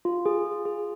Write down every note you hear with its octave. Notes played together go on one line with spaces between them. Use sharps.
F4
G#4
F4
G#4